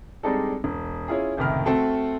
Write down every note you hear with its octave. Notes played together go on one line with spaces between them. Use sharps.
G3 G#3 C4 D4 D#4 A4
E1
C#4 E4 F4 G#4
F#1 C2 A2 D#3 B5 F6
A3 C4 F#4 A4